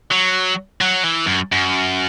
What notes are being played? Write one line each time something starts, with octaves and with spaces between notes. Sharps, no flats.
F#3
F#3
E3
F#2
F#2